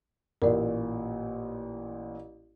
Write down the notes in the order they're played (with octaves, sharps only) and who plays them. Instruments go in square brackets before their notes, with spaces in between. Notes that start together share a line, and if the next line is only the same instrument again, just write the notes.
[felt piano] A1 A#2 [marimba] A#4 D5